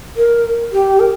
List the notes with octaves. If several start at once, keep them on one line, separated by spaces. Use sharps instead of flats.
A#4
G4
A#4